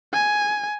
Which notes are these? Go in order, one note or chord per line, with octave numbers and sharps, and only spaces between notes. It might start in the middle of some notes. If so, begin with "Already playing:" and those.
G#5